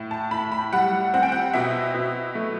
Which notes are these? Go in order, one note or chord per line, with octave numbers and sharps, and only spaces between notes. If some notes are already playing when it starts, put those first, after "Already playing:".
Already playing: A2
A5
A2 B5
B5
G3 F#5
C4 F#5
G5
F#5
B2 E5
B2
A3